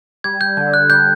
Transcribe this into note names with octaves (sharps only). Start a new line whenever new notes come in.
G3 G#6
G6
D3 G6
F#6
G3 G6